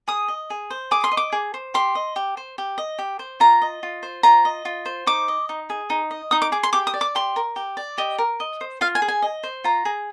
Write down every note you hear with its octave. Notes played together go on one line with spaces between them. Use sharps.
G#4 D#6
D#5
G#4
C5
G#4 D6
C6
D#5
D6
G#4
C5
G4 C6
D#5
G4
C5
G4
D#5
G4
C5
F4 A#5
D#5
F4
C5
F4 A#5
D#5
F4
C5
D#4 D6
D#5
D#4
G#4
D#4
D#5
D#4 D#6
D6
G#4 D6
C6
G4 D6
D#6
D5
D6
G4 C6
A#4
G4
D5
G4 D#5
A#4
D#5
C5
F4 F5
G#5
G#4
G#5
D#5
C5
F4 A#5
G#4